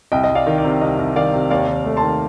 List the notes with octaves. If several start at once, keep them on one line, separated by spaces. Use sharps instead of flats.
C2 D#5 G5
D#5
C2
D5 F5
D#3
D5
C3
C2 D#5
C2
D#3 D5 F5
C3
D#2 D5 F5
D#2
A3
A5 C6
D#3